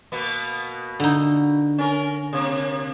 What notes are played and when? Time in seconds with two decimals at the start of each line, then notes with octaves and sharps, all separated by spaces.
0.12 B2 A#3 B3
1.00 D3 D#4
1.78 C#4 A#4
2.33 C3 A#3